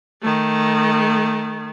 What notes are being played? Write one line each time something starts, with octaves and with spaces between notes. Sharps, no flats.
D#3 A3